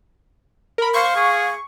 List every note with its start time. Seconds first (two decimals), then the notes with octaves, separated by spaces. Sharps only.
0.78 A#4 B5
0.94 C5 F5 C#6
1.16 G#4